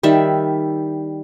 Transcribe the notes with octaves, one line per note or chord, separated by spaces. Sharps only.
D#3 G3 E5